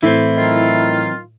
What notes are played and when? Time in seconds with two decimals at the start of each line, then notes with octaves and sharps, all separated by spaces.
0.03 A2 E3 C4 E4
0.37 D#3 F#3 F4